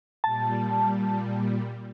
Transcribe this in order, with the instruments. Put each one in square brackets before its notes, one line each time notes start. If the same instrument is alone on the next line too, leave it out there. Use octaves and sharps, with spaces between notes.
[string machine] A#2 G3 [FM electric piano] A5